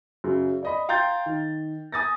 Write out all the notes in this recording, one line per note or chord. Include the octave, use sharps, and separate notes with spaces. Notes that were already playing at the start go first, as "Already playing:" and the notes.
F#2 C#3
D5 D#5 B5
F5 G5 A#5 C6 G6 A6
D#3
G#5 D#6 A6 A#6